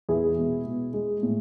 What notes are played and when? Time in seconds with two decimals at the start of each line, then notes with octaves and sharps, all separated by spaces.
0.09 E2 E4 G#4
0.37 B2 G#3
0.66 B2
0.94 G#3
1.23 A2